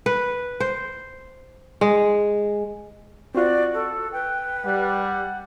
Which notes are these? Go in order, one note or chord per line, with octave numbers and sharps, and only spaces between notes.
B4
C5
G#3
C4 F4 F#4 D5
A4
B4 G5
G3 F#5